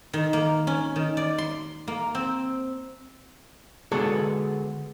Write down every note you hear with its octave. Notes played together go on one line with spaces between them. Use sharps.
D#3
A#3
C#4
D#3
D5
C6
A#3
C4
D3 G#3 B3 F#4 G#4 A4